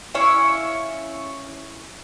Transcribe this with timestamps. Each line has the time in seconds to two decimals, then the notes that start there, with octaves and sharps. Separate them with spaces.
0.14 C#4 E4 C#5 F5